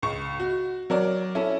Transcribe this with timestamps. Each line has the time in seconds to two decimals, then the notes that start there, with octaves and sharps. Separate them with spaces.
0.02 C#2 C#6
0.40 F#4
0.90 F#3 A#4 D5
1.35 C#4 E4 A4